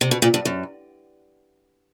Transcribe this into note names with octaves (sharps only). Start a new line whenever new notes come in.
C3
B2
A#2
G2
F#2